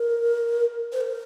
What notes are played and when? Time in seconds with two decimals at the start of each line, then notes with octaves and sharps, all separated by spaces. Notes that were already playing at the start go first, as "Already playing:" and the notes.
Already playing: A#4
0.92 C5
1.01 A#4